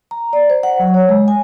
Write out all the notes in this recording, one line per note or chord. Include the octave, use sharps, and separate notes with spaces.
A#5
D5
C5
F#5
F#3
C#5
G#3
G#5